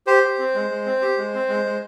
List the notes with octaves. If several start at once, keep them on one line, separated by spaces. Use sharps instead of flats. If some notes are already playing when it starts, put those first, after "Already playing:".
G4 C5
G4
C4
G#3
G#3
C4
G4
G#3
C4
G#3
G#3